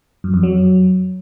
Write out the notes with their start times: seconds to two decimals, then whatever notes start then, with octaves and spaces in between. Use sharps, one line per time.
0.24 F#2
0.34 F2
0.43 F#3